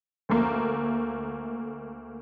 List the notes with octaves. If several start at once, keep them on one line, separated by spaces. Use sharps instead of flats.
D2 A3 A#3